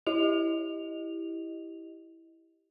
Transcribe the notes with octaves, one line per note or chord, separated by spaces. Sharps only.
E4 G4 D#5 F7